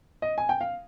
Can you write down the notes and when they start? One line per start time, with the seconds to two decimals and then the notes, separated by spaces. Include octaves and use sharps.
0.22 D#5
0.38 G#5
0.49 G5
0.61 F5